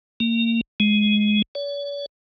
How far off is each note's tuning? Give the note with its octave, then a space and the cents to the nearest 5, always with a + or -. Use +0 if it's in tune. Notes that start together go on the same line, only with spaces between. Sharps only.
A#3 -25
G#3 +15
C#5 +45